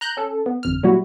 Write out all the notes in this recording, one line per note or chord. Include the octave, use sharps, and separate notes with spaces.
A#5 F#6 G6
C#4 A4
B3
G1 F2 F6
A#2 F#3 G3 E4 F#4